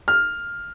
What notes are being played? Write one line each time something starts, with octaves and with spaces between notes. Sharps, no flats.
F6